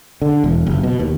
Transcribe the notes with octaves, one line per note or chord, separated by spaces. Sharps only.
D3
E1
F#1
B2
D#2